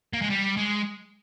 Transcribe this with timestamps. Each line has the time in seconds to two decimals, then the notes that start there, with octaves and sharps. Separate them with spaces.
0.13 A#3
0.22 G#3
0.30 G3
0.57 G#3